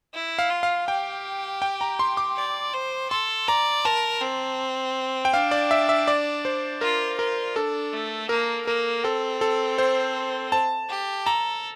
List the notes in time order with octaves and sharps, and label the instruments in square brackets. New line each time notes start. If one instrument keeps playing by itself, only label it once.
[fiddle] E4
[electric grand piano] F5
[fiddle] F4
[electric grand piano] F5
[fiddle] G4 [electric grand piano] G5
[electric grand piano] G5
A#5
C6
D6
[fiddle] D5
C5
[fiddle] A4 [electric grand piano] C6
[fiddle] D5 [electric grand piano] A#5
[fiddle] A#4 [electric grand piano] A5
[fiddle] C4
[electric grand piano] G5
[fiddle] D4 [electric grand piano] F5
[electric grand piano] D5
E5
E5
D5
C5
[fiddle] F4 [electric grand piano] A#4
[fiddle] F4 [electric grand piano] A#4
[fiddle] D4 [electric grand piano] A4
[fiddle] A3
[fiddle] A#3 [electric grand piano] A#4
[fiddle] A#3 [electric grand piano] A#4
[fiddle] C4 [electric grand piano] A4
[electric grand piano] A4
C5
A5
[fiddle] G4
[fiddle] A4 [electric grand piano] A#5